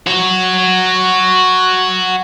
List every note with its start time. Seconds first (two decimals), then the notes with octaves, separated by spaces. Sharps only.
0.07 F#4 C#5